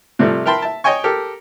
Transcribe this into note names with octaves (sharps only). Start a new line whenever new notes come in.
C3 F3 G3 A3
A#4 E5 G5 A5 B5 C6
E5 A5
C#5 D#5 G5 G#5 C#6
G4 A4 A#4